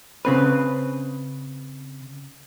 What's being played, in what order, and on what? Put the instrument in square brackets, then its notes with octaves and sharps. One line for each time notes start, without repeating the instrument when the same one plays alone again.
[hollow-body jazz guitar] C#3 C4 B4